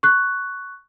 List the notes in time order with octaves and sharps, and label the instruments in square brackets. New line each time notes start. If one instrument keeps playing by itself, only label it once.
[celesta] C#6 F#6